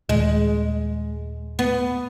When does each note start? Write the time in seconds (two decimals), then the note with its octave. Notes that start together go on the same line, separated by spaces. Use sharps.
0.09 D#1 G#3
1.59 B3